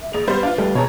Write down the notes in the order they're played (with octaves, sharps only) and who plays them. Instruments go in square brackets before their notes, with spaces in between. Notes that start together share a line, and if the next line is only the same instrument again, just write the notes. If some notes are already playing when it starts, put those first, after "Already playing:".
[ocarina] E5
[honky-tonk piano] A#1 F7 [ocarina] G#4
[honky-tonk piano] G3 B3 C5 [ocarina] B4
[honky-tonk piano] D4 F4 [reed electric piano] F5
[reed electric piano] G3 A3
[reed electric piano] B2 G#4 A5 [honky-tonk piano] C#5 A#5